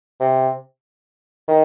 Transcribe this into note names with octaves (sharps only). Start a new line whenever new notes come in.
C3
D#3